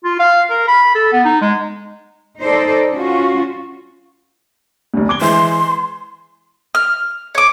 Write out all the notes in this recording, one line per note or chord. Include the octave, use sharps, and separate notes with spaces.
F4
F5
A#4
B5
A4
B3
D#4
G#3
D#4 A4 C5 D5 D#5
C#4 F4 F#4
F1 D2
D6 G#6 G7
E3 G#3 E5 C6
F6
C#5 D6